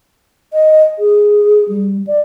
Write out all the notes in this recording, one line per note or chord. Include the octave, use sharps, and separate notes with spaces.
D#5
G#4
G3
D5